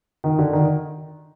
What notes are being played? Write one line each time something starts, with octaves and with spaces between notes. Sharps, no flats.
D#3
D3
D#3